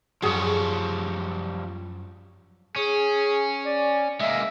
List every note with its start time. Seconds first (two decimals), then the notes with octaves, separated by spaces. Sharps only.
0.22 F#2 F3 G3 G#4 C#5
2.76 C#4 G#4
3.65 D5
4.21 G#3 A#3 E5